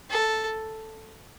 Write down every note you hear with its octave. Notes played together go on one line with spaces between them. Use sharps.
A4